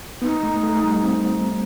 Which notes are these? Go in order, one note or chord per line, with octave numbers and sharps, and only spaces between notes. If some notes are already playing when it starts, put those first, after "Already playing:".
B3 D#4
A3
A3
G3
C4